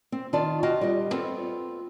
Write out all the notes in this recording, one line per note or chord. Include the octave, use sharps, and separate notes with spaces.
C4
D#3 F4 D5 A5
F4 F#4 D#5 G5
G3 D#5
B3 C4 F4 A4